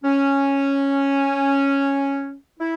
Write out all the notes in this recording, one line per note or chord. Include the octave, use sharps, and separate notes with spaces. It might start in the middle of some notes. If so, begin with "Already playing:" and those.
C#4
E4